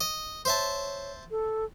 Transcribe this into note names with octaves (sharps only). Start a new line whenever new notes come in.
D#5
C5 C#5 E5 A5
A4